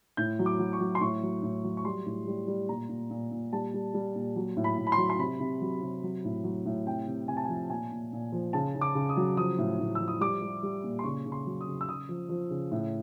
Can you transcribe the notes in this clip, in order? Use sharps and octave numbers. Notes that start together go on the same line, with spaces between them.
A2 G6
F#3
D6
F#3
C#6
F#3
C6
A2 C#6
F#3
A2
F#3
C#6
G3 C6
A2
G3
G3
A#2 A#5
A#2
A#2
A#2
G3 A5
G3
G3
A#2
F#3
A2
B5
A2
B5
C6
F#3
C6
C3 B5
C3
F#3
C3
F#3
A2
F#3
A2
C3 G5
C3
C3 G#5
A5
F3 G#5
A#2 G#5
A#2
A#2
F3
C#3 A5
C#3
D6
C#3
D#6
F#3
F3 D#6
A2
A2
F3 E6
D#6
G3 D6
G3
G3
A#2
C6
C#3 C#6
C#3
C6
F#3
D#6
C#3
E6
C#3 D#6
F3
F3
C#3
A2